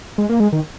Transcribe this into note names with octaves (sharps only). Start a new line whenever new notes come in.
G#3
A#3
G#3
D#3